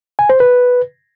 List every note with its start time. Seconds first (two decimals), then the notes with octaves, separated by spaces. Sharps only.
0.19 G#5
0.29 C5
0.40 B4